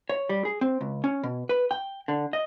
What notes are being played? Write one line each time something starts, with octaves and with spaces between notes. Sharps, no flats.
C#5
G3
G#4
C4
C#2
C#4
B2
B4
G5
D3
D#5